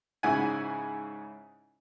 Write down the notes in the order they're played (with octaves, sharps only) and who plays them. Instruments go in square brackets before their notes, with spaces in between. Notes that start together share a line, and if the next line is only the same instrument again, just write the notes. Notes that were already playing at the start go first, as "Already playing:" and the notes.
[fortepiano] G#2 C#3 E4 F#5 G#5